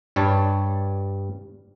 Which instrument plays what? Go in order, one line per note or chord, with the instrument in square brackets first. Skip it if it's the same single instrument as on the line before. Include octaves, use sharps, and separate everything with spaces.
[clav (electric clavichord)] G2 G3 C#5 A5